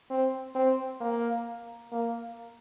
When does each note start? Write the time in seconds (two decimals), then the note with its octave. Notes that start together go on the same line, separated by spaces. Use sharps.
0.11 C4
0.56 C4
1.01 A#3
1.92 A#3